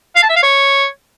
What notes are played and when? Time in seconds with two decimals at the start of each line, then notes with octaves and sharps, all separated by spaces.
0.16 F5
0.22 A5
0.29 E5
0.36 F5
0.43 C#5